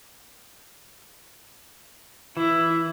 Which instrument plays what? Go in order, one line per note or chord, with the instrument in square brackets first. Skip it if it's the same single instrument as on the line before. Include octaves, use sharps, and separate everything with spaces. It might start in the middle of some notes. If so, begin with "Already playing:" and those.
[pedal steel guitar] E3 [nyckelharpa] E4